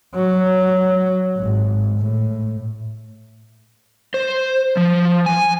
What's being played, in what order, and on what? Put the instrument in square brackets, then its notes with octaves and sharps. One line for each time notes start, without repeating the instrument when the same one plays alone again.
[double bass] F#3
G#1
A2
[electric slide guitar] C5
F3
G#5